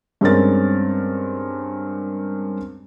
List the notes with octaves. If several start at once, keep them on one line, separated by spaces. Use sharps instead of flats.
G2 G#3 C4 C#4 A#4 A6